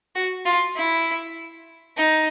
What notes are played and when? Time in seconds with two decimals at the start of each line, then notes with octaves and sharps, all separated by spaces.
0.15 F#4
0.45 F4
0.76 E4
1.97 D#4